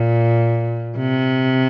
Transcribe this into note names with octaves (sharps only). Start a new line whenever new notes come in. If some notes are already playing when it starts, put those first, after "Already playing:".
Already playing: A#2
C3